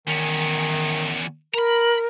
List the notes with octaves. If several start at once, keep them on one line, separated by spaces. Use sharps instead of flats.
E2 D#3 C#4
A#4 A#5 B5